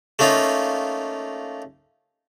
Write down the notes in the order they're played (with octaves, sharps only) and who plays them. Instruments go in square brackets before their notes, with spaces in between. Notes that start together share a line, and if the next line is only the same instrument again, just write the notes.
[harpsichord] A3 A#3 C#4 D#4 F4